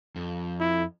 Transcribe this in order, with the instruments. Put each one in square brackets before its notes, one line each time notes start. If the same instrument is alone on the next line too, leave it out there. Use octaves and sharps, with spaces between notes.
[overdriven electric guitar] F2
[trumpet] E4